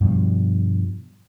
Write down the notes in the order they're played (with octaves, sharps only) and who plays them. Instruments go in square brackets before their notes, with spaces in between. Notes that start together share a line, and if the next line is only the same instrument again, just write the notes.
[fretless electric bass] G2 B2 F3